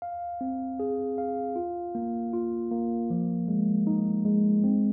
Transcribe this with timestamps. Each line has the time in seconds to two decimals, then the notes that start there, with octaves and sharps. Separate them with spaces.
0.02 F5
0.41 C4
0.80 G#4
1.18 F5
1.56 F4
1.95 A#3
2.33 F4
2.71 A#3
3.10 F3
3.48 G#3
3.87 D#4
4.25 G#3
4.64 C4